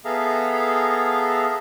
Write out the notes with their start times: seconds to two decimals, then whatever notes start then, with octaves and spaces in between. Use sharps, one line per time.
0.05 B3 G#4 A4 E5 F5 A#5